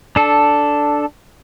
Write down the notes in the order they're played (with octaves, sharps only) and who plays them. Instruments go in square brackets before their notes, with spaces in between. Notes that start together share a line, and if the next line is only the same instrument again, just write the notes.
[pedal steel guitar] D4 A4